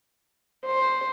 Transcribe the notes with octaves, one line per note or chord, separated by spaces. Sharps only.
C5